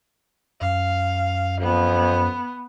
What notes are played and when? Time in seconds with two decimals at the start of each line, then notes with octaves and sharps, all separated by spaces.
0.61 F#2 F5
1.61 F2 B3